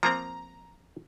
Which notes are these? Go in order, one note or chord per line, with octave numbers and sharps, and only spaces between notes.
F3 A#3 C4 A#5